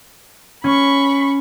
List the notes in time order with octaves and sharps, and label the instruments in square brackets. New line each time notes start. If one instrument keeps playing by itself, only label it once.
[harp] C#4 [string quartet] B5 C#6